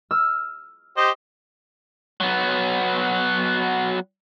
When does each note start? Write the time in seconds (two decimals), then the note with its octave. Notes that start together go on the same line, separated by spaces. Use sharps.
0.11 E6 F6
0.97 G4 C5 D#5
2.21 F#3 B3